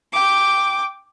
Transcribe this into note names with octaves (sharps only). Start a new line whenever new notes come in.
G5 D6